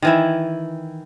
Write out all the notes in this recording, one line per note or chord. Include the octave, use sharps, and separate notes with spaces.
D#3 E3 E4